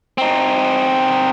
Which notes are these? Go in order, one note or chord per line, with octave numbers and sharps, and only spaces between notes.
C4 D#4